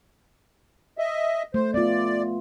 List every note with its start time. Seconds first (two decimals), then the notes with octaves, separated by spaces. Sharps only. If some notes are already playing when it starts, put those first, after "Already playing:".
0.98 D#5 E5
1.54 A3 C5
1.74 B3 F4 D5